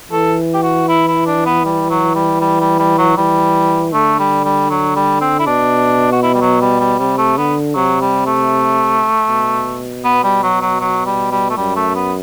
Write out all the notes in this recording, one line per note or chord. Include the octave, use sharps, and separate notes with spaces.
E3 A4
G4
F#4
E4
E4
D4
B3
G3
F#3
G3
G3
G3
G3
F#3
E3 G3
D3 A3
G3
G3
F#3
G3
C4
E4
B2 D4
F#4
E4
G3
F#3
G3
G3
C3 G3
A3
D3 B3
C3 F#3
G3
A3
B2
B3
G3
F#3
F#3
F#3
G3
G3
A3
F#2 G3
A3
B3